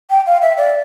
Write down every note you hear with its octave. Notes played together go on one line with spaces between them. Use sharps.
G5
F5
E5
D5